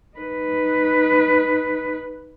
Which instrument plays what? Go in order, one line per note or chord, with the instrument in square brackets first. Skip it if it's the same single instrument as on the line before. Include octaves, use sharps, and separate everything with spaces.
[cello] D#4 B4